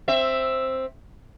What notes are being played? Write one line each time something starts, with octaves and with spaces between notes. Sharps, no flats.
C4 E5